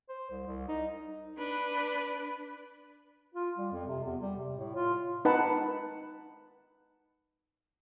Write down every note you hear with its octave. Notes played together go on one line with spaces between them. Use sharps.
C5
C2
C2
D#4
D4 B4
F4
G3
F2
C3
E2
G3
C3
A2
F4
D#4 B4 F#5 A5